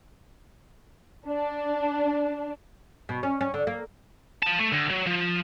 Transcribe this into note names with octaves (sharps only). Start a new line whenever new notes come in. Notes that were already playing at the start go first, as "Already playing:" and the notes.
D4
B2
C#4
C#4
D3
A#3
F4 A5
A3
D2
F#3
F3